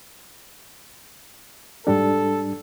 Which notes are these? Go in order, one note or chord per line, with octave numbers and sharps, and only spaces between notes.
G#2 G3 D4 A4